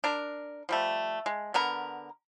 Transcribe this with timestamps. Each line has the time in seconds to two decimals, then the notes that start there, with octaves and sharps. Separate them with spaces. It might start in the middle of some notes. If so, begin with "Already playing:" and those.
0.04 D4 A#4
0.69 F3 G3 A3
1.26 G#3
1.54 D3 B3 A#4 A#5